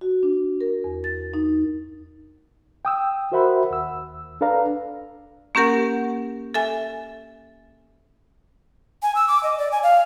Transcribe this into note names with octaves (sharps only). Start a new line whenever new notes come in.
F#4
D4
A#4
E2
A6
D#4
G5 D#6 E6
F#4 A#4 C5 E5 F#5 B5
D#2 E6
D4 A4 B4 D5 F5 A#5
A#3 C#4 G4 A#4 F#5
A4 E5 G#5
G#5
E6
D6
D#5
D5
G#5
F5